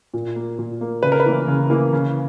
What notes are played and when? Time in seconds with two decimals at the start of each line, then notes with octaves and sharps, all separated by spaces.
0.14 A#2
0.36 A#3
0.59 A#2
0.81 A#3
1.03 C#3 B4
1.12 A#4
1.20 B4
1.26 E3 A#3
1.48 C#3
1.70 E3 A#3
1.93 C#3